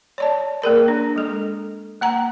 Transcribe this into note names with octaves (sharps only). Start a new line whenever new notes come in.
C#5 D5 A5
A#3 G#4 A#4 D5
D4
G#3 A4
A#3 F#5 A#5